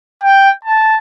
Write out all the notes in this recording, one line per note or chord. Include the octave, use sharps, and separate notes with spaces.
G5
A5